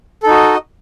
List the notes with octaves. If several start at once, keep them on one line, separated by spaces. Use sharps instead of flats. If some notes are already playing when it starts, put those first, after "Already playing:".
D#4 F#4 A4 D#5